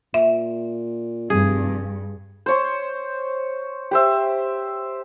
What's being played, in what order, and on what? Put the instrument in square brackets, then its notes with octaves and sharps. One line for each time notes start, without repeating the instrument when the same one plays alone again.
[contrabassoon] A#2 [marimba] E5
[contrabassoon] F1 [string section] G2 [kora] G#4
[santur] C5 C#5 C6
G4 C5 E5